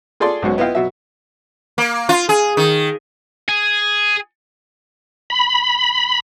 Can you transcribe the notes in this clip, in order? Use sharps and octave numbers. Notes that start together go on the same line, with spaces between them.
F4 G#4 A4 D5 C6
B1 G#2 B2 C#4
B3 E4 F4 D#5 F5 G5
B2 F#3 E5
A#3
F4
G#4
D#3
G#4
B5